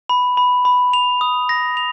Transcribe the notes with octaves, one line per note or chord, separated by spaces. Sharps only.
B5
B5
B5
F7
D#6
A#6
F7